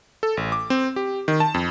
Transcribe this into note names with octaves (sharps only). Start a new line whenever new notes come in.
A4
A1
D6
C4
G4
D#3
A5
F2